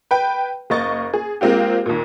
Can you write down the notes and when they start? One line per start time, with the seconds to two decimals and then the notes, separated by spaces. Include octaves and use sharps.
0.11 B4 G5
0.70 F#1 A#3 D#5 C#6 A6
1.14 G#4
1.41 G#3 A#3 C4 F4 G4
1.86 D#2 A#2